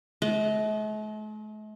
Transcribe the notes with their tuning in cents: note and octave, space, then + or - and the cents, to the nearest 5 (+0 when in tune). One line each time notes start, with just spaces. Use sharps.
A3 -45 D#5 +0